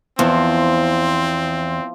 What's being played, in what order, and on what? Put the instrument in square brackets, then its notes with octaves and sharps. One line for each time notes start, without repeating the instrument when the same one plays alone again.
[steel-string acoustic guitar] E2 [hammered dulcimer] F3 [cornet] C4